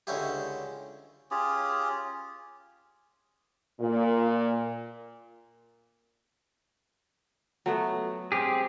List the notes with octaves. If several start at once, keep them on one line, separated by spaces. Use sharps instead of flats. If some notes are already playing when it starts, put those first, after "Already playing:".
C#2 D3 C#4 E4 G4
C#4 F4 G4 G#4
A#2
F#3 A3 B3
C4 G4 G#4